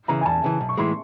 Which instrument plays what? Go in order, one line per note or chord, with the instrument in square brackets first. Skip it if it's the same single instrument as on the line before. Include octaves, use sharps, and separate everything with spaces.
[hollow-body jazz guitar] C#3 E3 [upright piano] A#5
[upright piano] G#5
[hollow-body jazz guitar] E2 [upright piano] A5
[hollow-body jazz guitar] C#3 E3
B1
[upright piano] C#6
[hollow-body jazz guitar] A2 E3 G#3 [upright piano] C6